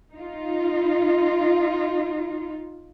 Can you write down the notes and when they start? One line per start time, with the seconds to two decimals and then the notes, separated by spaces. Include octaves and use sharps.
0.14 D#4 F4